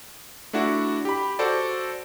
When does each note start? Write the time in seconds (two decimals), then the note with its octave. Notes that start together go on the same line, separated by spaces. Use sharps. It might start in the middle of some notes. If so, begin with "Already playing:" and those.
0.53 A3 D4 E4 F#4
1.05 G4 B5
1.39 F#4 A4 C5 D5